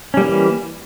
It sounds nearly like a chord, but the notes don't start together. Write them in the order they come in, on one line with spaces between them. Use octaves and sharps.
C#4 G3 A#3 E3